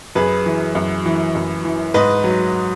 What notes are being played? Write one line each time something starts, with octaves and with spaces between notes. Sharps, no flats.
F#2 G#4 B4
E3
F#2
E3
F#2
E3
G#2 B4 D#5
F#3